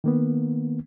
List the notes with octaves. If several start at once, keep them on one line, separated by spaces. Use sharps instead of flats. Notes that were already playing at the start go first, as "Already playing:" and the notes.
D#3 A#3 B3